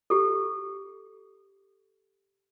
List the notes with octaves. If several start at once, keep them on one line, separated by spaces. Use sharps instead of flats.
G4 A4